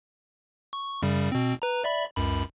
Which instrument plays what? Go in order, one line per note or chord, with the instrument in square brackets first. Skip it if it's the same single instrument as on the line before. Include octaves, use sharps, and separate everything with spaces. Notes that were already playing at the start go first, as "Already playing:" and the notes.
[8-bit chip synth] C#6
F#2 C#3 G3
B2 C4
B4 A#5
D5 E5 B5
C#2 F#2 B5